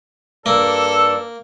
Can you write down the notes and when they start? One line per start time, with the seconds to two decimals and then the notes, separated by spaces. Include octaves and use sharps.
0.46 G2 A#3 A4 D5 E6